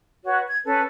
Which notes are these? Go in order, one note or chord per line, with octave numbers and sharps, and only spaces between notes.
F#4 B4 C#5
G#6
C#4 A4 B4